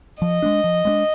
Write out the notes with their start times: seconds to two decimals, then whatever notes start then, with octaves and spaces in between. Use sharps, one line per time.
0.22 F3 D#5
0.42 G#3 B3 D4
0.64 F3
0.85 G#3 B3 D4